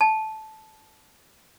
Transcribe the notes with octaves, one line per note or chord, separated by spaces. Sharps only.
A5